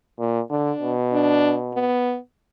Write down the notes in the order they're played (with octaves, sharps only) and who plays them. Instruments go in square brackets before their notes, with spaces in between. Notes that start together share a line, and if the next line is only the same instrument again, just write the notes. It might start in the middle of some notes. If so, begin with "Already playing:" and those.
[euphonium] A#2
[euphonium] D3 [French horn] D4
[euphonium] B2
[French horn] D4
B3